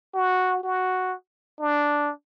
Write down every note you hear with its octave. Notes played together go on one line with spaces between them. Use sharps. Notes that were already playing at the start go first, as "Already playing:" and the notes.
F#4
F#4
D4